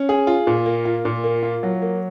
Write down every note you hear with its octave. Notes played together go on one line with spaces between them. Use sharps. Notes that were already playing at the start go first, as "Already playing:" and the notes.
Already playing: C#4
G#4
F4
A#2
A#3
F4
A#2
A#3
F4
F#3
A#3